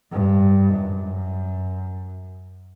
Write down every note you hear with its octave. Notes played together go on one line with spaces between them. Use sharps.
G2
F#2